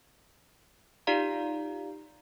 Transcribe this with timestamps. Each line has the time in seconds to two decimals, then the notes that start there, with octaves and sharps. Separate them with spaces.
1.07 D#4 F4 G4 D5 F5 A#5